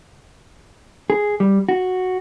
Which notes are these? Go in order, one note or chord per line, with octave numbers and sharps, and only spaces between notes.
G#4
G3
F#4